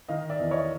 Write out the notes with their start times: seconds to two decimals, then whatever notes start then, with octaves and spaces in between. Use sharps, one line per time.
0.08 D#3 D#5 F5
0.30 D5 E5
0.40 E2
0.51 C#5 D#5